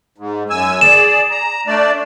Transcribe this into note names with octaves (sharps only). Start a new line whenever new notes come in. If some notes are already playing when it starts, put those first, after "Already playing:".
G#2
F#2 G#5 E6
G#4 D5 E7
A#5
A3 D4 D5